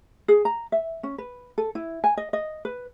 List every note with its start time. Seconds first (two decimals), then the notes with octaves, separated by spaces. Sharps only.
0.28 G#4
0.45 A#5
0.72 E5
1.03 C#4
1.18 B4
1.58 A4
1.75 E4
2.04 G#5
2.17 D#5
2.33 D#5
2.65 B4